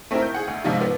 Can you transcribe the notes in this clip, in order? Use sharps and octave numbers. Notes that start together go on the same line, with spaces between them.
A3 C4 D#4 E4 A#4
G6
G#4 F#5
D2
G#2 C3 F3 D#4 F4
B3